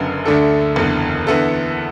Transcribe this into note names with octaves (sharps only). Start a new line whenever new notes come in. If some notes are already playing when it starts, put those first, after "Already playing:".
Already playing: F#1 F#2 D3 B3
D2 D3 A3 D4 A4
F#1 E2 D3
E2 D3 B3 E4 A4